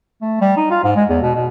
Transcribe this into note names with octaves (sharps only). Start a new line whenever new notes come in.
A3
G3
D#4
F4
G#2
G#3
E2
B2
B2